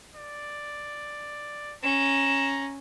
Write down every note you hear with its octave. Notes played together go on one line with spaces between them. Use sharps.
D5
C#4 A#5 E7